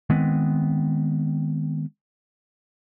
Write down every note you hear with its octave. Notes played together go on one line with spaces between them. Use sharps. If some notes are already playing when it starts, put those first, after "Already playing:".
D#3 G#3 B3 C4